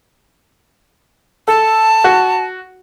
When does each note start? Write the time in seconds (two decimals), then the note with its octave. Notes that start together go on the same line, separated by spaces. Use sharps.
1.48 A4 A5
2.04 F#4